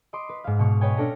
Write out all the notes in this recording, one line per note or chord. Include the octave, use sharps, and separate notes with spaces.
D#5 B5 C6 D6
B4
G#2 F5
B2 C#6
B4 C#5 D#5 G5 G#5
C#4 D4 A4 A#6